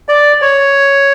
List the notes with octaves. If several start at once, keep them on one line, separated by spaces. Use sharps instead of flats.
D5
C#5